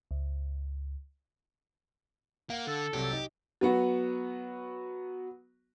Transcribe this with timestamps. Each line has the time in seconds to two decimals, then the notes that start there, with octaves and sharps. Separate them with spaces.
0.11 C#2
2.50 A#3 F5 F#5
2.67 D3 A4
2.93 C2 C3 F#3 G4
3.12 D#4
3.61 F#3 B3 F#4